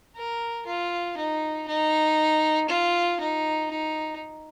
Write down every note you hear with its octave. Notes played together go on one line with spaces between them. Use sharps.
A#4
F4
D#4
D#4
F4
D#4
D#4